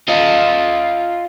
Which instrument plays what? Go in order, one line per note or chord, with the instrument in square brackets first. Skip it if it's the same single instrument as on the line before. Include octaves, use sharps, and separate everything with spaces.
[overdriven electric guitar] F4 D#5